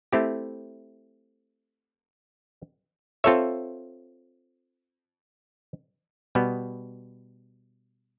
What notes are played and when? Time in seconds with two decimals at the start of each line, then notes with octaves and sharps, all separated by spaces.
0.13 A3 C4 E4 G4
3.24 C4 F4 A4 C#5 E5
6.35 B2 G3 B3